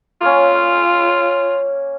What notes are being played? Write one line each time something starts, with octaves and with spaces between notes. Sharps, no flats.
A#3 C#4 F4